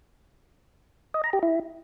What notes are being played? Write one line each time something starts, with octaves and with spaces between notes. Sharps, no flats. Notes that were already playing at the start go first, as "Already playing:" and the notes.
D#5
A#5
G4
E4